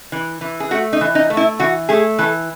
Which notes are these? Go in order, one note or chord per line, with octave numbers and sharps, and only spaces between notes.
E3
E3
G#4
A3 F#4
D#4
E3
D#4
A3
E4
E3 F#4
A3 G#4
E3 A4